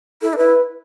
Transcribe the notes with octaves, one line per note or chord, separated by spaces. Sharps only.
E4 A4
D4
E4 B4